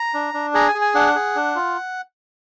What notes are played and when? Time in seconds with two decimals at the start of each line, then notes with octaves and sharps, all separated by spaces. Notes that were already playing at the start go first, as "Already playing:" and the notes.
Already playing: A#5
0.14 D4
0.34 D4
0.54 G#4 A#5
0.68 G#5
0.75 G#4
0.81 G#5
0.95 D4 F#5
1.15 G#4
1.36 D4
1.55 F4